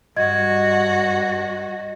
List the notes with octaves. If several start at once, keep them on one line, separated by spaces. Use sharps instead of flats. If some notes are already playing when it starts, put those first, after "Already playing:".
G2 F#4 D#5 G#6